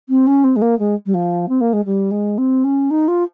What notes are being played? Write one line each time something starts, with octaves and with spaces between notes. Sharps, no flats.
C4
C#4
C4
G#3
A#3
G#3
G3
F3
C4
A#3
G#3
G3
G#3
C4
C#4
D#4
F4